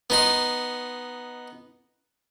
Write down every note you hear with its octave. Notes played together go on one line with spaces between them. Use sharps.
B3 D#4 C6